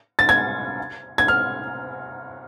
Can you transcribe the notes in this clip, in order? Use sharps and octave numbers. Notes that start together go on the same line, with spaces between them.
A6
G#6
G#6
F6